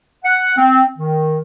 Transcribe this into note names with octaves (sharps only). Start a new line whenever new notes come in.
F#5
C4
D#3